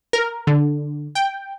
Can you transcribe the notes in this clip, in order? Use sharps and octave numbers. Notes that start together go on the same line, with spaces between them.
A#4
D3
G5